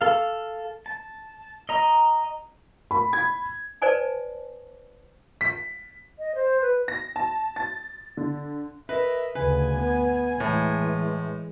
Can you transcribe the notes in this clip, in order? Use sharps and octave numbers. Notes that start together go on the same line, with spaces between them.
A4 F5
A5
D#5 A#5
B5
G#6
B4 C5 D5 G#5 A5
B6
D#5
C5
B4
A#6
A5
A6
D3
A#4 B4 D#5 E5
D2 C#3 B4 G#5
B3
A2 E3 G#3